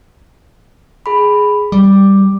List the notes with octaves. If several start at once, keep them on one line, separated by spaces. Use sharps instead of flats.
G#4 B5
G3 D6